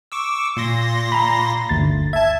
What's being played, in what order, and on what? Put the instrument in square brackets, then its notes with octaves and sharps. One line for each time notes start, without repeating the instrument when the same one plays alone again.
[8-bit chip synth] C#6 D6 E6
A#2 C6 A#6
[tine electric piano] A#5 B5
G1 D2 A6
[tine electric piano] E5 [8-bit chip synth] A5 G#6